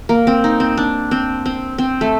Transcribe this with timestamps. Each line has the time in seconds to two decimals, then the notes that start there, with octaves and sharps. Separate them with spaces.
0.09 A#3
0.27 C4
0.44 D#4
0.60 C4
0.77 D4
1.11 C4
1.46 C4
1.78 C4
2.01 A3